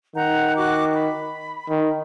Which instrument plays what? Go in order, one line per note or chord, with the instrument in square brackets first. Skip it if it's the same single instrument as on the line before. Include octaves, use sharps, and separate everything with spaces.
[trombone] D#3 [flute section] F#5 A#5 G6
[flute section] F#4 D6 F#6
B5
[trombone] D#3